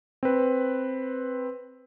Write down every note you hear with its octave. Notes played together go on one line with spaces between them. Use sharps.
C4 B4